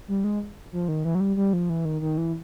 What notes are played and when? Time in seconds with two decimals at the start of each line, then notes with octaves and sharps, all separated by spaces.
0.08 G3
0.24 G#3
0.72 F3
0.88 D#3
1.05 E3
1.15 F#3
1.20 G3
1.36 G3
1.53 F3
1.69 E3
1.85 D#3
2.01 D#3
2.17 E3